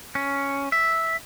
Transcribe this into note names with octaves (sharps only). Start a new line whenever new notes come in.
C#4
E5